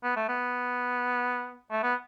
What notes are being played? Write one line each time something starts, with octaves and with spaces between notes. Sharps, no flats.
B3
A3
B3
A3
B3